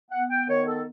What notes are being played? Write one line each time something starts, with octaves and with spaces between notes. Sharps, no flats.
B3 F#5
G5
D#3 C#5
A4